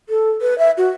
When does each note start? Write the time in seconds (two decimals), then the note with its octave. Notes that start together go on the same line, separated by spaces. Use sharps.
0.09 A4
0.41 B4
0.58 E5
0.77 F#4